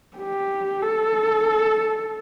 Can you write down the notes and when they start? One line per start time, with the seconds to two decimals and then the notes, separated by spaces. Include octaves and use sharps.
0.17 G4
0.82 A4